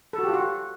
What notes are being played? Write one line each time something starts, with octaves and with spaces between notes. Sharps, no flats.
A4
F#4
G4
F4
F#4